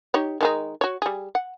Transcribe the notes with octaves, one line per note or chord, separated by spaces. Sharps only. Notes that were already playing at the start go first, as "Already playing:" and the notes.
D#4 G4 C#5
D#3 G#3 D#4
F#4 C#5
G3 G#4
F#5